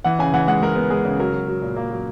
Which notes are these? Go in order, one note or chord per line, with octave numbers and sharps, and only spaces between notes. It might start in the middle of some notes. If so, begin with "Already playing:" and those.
E3 F#5
C#3 G#5
E3 F#5
G#3 F#5
G#3 A#4
B3
G#3 G#4
C#3
F#3 A#4
F#3
F#3
A#2
A#3
F#3